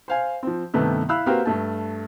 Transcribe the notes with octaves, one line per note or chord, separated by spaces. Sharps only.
C5 F5 G#5
F3 C4
G2 C3 D#3 A3 B3
E4 F5 B5 E6 F#6
A#3 C4 F#4 G4 B4 F5
G2 A3 A5